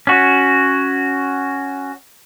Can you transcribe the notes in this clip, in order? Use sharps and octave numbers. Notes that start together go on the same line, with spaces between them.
C#4 F#4